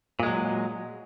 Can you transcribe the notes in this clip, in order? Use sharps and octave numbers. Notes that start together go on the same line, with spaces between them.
A#2 F#3 G#3